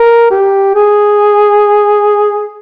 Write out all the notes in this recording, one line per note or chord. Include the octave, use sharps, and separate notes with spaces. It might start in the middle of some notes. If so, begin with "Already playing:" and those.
Already playing: A#4
G4
G#4